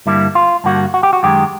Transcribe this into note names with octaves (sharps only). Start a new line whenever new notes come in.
G2 D3 G3 A#3 E4
F4
G2 D3 G3 A#3 F#4
F#4
G4
F#4
F#2 D#3 G#3 G4